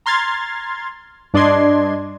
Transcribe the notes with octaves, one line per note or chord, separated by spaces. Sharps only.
A#5 C6 F6 G#6 A6
G2 D4 D5 D#5 C6 G#6